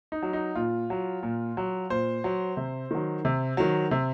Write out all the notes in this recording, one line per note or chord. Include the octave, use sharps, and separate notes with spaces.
D#4
F#3
D#4
A#2 F4
F#3
A#2
F#3
A#2 C5
F#3
C3
D#3 F#3
C3
D#3 F#3
C3